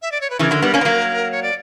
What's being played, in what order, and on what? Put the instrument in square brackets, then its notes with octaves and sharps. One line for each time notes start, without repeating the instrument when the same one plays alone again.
[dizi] E5
D5
C#5
B4
[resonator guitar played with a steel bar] C#3 E3 [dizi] A#4
[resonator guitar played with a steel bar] D3 F#3
G3 B3
A#3 C#4
B3
F#3 A#3
[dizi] C#5
D5